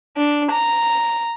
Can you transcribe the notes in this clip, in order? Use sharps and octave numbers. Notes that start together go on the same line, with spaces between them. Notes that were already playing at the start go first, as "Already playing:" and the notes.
D4
A#5